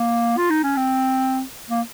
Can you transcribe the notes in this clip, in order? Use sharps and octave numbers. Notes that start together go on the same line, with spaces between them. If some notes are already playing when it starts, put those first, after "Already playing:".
Already playing: A#3
F4
D#4
C#4
C4
A#3